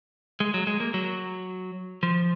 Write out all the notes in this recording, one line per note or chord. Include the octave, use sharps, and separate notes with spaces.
G#3
F#3
G#3
A#3
F#3
F3